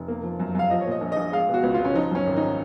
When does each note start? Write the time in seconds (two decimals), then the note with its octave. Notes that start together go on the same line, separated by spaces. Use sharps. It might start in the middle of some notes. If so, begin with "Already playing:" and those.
Already playing: F1
0.08 A#3
0.24 F3
0.39 F#2
0.55 F#2 F5
0.70 F3 D#5
0.81 C#5
0.87 A#2 D#5
1.01 A#1
1.12 A#1 D#5
1.32 G#3 F5
1.49 B2
1.54 F#4
1.63 C#2
1.74 C#2 F4
1.85 C#4
1.94 F3 D#4
2.11 F#2 C#4
2.27 G#1
2.36 D#4